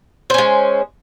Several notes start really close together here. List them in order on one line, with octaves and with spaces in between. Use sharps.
C5 C#4 G#3